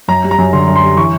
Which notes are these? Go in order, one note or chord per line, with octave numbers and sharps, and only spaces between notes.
F#2 A#5
G3
A#5
F#2
D3 C6
F#2
C6
G3
E3 C#6